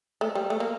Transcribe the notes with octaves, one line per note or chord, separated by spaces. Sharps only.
A3
G3
A3
A#3